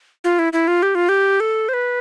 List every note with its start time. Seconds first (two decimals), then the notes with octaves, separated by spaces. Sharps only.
0.24 F4
0.39 E4
0.53 E4
0.68 F4
0.83 G4
0.95 F4
1.09 G4
1.40 A4
1.69 C5
1.74 B4